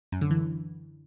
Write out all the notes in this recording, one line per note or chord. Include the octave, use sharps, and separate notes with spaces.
F#2
D3
E3